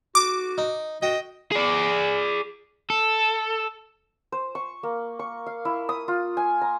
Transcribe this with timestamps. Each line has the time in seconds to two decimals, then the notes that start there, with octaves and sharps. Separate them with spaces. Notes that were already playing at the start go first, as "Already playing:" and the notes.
0.15 F#4 D6
0.58 D#4
1.02 F#4 D#5 G5
1.52 G#4 D5
2.90 A4
4.32 C5
4.55 C#6
4.83 A#3
5.19 C#6
5.46 F5
5.65 E4
5.89 D#6
6.08 F4
6.37 G#5
6.61 A#5